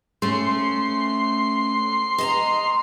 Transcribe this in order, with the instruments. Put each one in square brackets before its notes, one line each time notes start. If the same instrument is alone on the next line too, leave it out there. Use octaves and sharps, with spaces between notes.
[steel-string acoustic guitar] A3 C#4 [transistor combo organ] C6
[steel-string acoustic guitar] D#5 A5 A#5